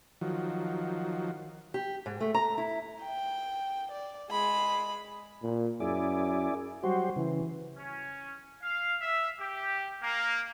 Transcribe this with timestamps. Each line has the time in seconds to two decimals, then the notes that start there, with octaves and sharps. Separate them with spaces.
0.21 D#3 F3 F#3
1.74 G4
2.06 G#2
2.21 A3
2.34 A#5
2.58 E4
3.02 G5
3.92 D5
4.30 G#3 B5
5.43 A#2
5.80 F#2 E4 G#4 D5
6.83 F#3 G3 F#4 C5
7.16 C#3 E3
7.77 C#4
8.62 F5
9.01 E5
9.40 G4
10.02 A#3